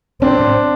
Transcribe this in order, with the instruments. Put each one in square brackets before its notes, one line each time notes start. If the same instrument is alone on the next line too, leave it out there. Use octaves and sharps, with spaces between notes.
[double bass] C4 [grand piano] D4